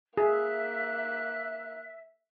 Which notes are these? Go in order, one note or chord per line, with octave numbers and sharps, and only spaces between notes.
A#3 G#4 E5 F#6